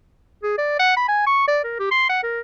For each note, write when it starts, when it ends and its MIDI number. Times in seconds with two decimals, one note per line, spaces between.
0.43 0.55 68
0.58 0.75 74
0.79 0.94 78
0.97 1.05 83
1.08 1.22 80
1.27 1.45 85
1.48 1.60 74
1.64 1.75 70
1.79 1.89 67
1.91 2.08 84
2.09 2.22 78
2.23 2.40 70